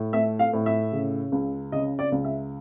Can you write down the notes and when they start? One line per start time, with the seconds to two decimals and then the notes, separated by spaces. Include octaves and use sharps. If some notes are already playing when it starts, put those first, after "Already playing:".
Already playing: A2
0.13 A3 E5
0.39 F5
0.53 A2
0.66 E5
0.92 C#3
1.32 C#2
1.72 C#3 D#5
1.99 D5
2.12 C#2
2.24 E5